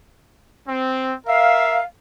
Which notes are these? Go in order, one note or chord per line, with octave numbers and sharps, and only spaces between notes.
C4
A#4 E5 F5